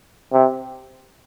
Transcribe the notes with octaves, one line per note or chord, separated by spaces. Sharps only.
C3